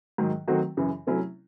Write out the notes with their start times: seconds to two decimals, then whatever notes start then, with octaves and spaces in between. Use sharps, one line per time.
0.18 G#2 D#3 F#3
0.48 D#3 F#3 A3 C4 F#4
0.77 F#2 C#3 E3
1.07 C3 F#3 A3 C#4 E4